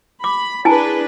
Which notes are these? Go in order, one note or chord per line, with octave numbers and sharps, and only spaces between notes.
B5 D6
D4 E4 G#4 B4 G#5 A5